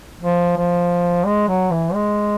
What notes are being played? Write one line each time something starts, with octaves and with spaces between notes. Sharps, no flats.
F3
F3
G#3
F#3
E3
G#3